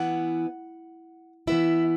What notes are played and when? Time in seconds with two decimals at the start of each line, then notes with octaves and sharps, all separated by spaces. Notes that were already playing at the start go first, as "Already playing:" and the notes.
Already playing: E3 B3 E4 F#5
1.47 E3 B3 E4 E5